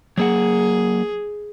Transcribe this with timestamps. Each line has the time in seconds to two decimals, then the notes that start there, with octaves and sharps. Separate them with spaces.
0.18 F#3 A#3 G#4 F#5